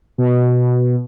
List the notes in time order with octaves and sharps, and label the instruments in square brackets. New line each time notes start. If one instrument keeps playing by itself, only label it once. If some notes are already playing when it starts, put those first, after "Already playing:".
[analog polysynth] B2